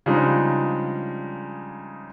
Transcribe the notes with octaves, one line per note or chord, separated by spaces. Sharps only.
C#3 F3 G3 G#3 D4 D#4